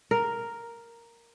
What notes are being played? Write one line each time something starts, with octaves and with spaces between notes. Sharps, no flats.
A#4